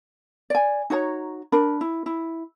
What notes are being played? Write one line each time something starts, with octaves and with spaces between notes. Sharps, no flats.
D5 G#5
D#4 F#4 C#5 A#5
D4 A#4 B5
E4
E4